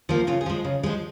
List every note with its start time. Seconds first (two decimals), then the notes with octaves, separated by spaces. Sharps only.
0.09 F3 A#3
0.27 C#3 F4
0.41 G#4
0.46 F3 G#3
0.64 C#3
0.83 F3 G#3